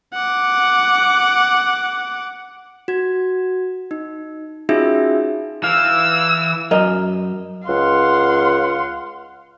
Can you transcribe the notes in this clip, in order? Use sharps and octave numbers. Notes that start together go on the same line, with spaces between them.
F#5 D6
F#4 G#6
D#4
C#4 D#4 F4 F#4 G#4 E5
E3 F5 E6
F#2 A#4 D#5
C#2 F5 F#5 C6